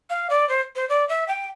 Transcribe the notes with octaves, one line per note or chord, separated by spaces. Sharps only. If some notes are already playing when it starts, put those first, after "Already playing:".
F5
D5
C5
C5
D5
E5
G5